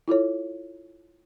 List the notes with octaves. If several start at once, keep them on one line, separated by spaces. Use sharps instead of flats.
E4 F4 A4 C#5